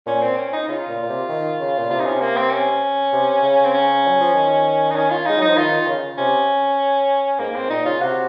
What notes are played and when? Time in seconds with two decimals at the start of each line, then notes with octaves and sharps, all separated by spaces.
0.06 A#2 C#4
0.22 C4
0.38 C#4
0.53 D#4
0.68 C#3 F4
0.89 A#2
1.03 A#2
1.09 C3
1.29 D#3
1.60 C#3
1.79 A#2
1.90 C3 F4
2.00 D#4
2.06 C#4
2.21 A#3
2.36 C4
2.51 C#4
3.13 C3
3.43 C#3
3.65 C4
3.74 C#4
4.07 F#3
4.20 F3
4.35 D#3
4.91 D#4
4.96 C#4
5.10 F4
5.26 G#3 D#4
5.38 F#3 D#4
5.47 F3
5.56 D#3 F4
5.80 D#3
5.87 C#3
6.18 C3 C#4
7.39 G#2 A#3
7.55 G#2 C4
7.70 A#2 D#4
7.85 C#3 F4
8.01 C3 F#4